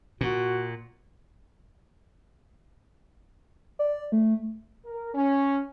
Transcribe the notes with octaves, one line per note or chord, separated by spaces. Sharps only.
A#2 F#4
D5
A3
A#4
C#4